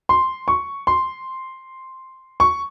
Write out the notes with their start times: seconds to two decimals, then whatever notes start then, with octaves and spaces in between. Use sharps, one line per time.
0.09 C6
0.48 C#6
0.87 C6
2.40 C#6